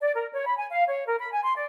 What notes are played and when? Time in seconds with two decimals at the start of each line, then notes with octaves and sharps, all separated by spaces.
0.01 D5
0.14 A#4
0.32 C#5
0.45 B5
0.56 G#5
0.70 F5
0.87 C#5
1.05 A#4
1.19 B5
1.31 G#5
1.43 C6
1.55 D5